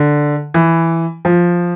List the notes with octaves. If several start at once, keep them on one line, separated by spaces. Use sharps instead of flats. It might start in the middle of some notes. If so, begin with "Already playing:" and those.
Already playing: D3
E3
F3